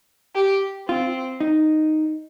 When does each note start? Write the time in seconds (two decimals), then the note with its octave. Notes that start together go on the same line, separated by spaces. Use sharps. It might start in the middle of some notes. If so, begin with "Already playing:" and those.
0.35 G4
0.88 C4 F4
1.40 D#4